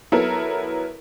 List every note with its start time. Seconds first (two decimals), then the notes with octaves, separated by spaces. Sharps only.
0.12 F#3 B3 E4 A4 A#4